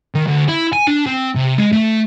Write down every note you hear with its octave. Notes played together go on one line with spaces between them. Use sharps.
D#3
D2
E4
G#5
D4
C4
C3
G#3
A3